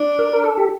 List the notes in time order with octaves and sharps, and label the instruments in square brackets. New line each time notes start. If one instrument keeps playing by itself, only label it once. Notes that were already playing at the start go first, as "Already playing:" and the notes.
Already playing: [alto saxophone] D4
[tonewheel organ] A#4
A#4
A4
G4